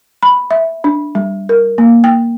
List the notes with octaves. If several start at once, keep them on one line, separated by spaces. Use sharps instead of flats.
B5
E5
D4
G3
A#4
A#3
G5